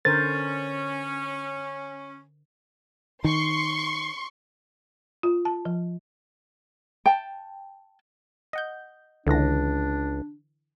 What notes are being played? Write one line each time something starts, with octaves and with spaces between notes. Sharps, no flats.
D3 C#4 A#4 C5 A6
D#3 C6 C#6
F4
A5
F3
G5 A5
D#5 F#5 G6
C#2 D3 E3 D4 A#6